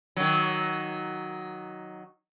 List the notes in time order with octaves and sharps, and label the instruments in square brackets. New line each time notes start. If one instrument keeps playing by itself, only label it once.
[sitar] D#3 F#3